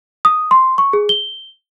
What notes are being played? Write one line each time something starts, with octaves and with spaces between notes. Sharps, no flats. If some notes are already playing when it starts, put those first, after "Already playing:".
D#6
C6
C#6
G#4
G7